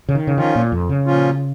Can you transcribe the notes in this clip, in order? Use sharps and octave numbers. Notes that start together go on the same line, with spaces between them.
C#3
D#3
C#3
D#3 F3 C#4 F4
A#2
F2
C#3
A#2 F3 C#4 F4